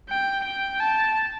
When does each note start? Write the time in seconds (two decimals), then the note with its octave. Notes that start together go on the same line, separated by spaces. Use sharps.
0.10 G5
0.45 G5
0.80 A5